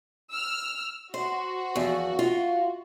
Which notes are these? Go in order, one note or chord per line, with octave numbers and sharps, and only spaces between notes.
E6 F6
F#4 C5
E2 F3
F4